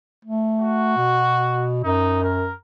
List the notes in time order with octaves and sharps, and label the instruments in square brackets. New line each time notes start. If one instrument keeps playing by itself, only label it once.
[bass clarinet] A3
[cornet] F#4
[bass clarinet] B2
[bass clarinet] F#2 [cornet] D#4
[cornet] A#4